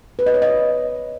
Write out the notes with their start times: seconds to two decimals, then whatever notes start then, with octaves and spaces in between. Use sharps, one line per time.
0.19 B4
0.26 D#5
0.34 C#5
0.42 D#5